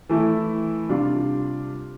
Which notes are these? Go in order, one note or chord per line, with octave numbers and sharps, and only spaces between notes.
E3 A3 E4
C3 G3 D4 F4